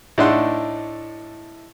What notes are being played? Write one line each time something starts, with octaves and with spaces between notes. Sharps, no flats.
A2 A3 D4 D#4 F#5 C6